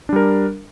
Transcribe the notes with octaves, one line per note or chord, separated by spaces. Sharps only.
G3 D4 A#4